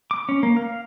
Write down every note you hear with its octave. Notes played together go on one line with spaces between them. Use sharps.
D6
C#4
A#3
F5